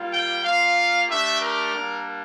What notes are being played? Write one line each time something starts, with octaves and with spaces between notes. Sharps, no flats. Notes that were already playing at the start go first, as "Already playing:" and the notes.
Already playing: G3 A#3 F4
G5
A#3 F4 F5
A3 D4 G4 E5
A#4
G3 A#3 D4